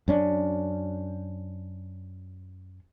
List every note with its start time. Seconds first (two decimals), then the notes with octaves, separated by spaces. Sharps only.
0.08 F#2 C#4 D4